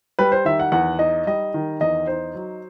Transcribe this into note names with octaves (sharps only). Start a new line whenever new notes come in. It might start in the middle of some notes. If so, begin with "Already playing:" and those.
G3 B4
C5
D#3 E5
F#5
E2 F#5
D#4 D#5
G3 D#5
D#3
E2 D#5
D#4 C5
F#3